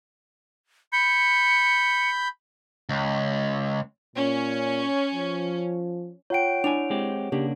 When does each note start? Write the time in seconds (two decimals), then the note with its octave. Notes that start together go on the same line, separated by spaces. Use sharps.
0.93 B5 G6 C#7
2.89 C#2
4.16 A#2 C#4
5.15 F3
6.30 F4 C#5 F#5 G5 D7
6.64 D4 E4 G#5 F7
6.90 G#3 C4 G4
7.32 C#3 A#3 D4 G4